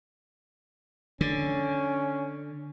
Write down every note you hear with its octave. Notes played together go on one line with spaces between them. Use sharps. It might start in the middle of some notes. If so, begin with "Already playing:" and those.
D3 C#4